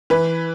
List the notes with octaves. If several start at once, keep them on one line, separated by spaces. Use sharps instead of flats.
E3 B4